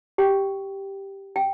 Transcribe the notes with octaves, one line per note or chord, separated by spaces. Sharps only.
G4 G5
G5